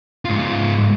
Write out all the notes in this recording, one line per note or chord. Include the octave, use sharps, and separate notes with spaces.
G#2 F4